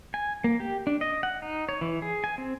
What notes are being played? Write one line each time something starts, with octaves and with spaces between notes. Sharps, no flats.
G#5
A#3
G4
D4
D#5
F#5
D#4
C#5
E3
G#4
G#5
C4